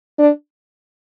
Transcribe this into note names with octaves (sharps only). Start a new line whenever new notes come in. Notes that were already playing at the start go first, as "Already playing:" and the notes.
D4